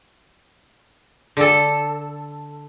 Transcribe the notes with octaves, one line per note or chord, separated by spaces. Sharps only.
D3 A4